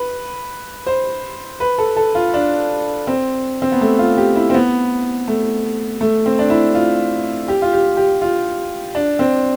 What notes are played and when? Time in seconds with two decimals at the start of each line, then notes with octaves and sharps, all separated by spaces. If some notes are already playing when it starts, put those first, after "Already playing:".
Already playing: B4
0.86 C5
1.60 B4
1.78 A4
1.96 A4
2.15 F4
2.34 D4
3.07 C4
3.62 C4
3.72 B3
3.81 A3
3.99 F4
4.17 G4
4.35 E4
4.50 C4
4.54 B3
5.28 A3
6.01 A3
6.26 C4
6.39 D4
6.50 E4
6.75 F4
7.48 G4
7.62 F4
7.73 G4
7.97 G4
8.21 F4
8.95 D4
9.19 C4